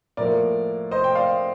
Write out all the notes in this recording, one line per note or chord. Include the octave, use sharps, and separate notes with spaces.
A2 F3 A#3 A#4 D5
C5 D#5
G5
D5 F5